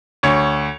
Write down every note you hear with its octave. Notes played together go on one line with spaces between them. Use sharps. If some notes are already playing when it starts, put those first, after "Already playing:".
D2 C#5